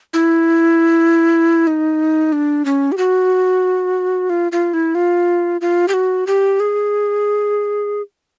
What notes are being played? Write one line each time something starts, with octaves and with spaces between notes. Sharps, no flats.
E4
D#4
D4
C#4
G4
F#4
F4
F4
E4
F4
F4
G4
F#4
G4
G#4